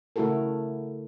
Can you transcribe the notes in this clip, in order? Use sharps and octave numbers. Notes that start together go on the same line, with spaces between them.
C#3 A3 E4 F#4 A4 A#4